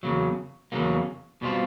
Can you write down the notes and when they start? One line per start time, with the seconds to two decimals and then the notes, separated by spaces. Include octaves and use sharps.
0.03 E2 C#3 F#3 A#3
0.72 E2 C#3 F#3 A#3
1.42 B2 G3 C4 F4